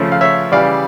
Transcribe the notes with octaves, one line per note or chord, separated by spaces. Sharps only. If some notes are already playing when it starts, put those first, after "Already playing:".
Already playing: C#3 F3 A3 C#4
F5
C#5 E5
C#3 E3 G3 D5 F5